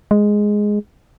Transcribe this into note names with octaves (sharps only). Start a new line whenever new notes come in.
G#3